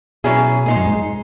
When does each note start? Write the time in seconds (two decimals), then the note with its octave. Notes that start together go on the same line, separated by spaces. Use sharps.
0.24 B2 F#3 C#4 E4 G#4
0.66 A#2 G#3 D#4 G#4
0.77 F#2
0.87 G#2